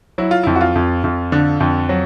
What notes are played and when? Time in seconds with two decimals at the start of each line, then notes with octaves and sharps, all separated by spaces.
0.18 F#3 E4
0.31 F4
0.43 F2 E4
0.56 F#4
0.61 F4
0.75 F2
1.04 F2
1.32 D3
1.60 F2
1.89 F#3